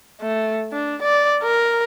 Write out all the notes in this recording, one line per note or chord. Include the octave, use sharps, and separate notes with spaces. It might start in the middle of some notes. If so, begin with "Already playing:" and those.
A3
D4
D5
A#4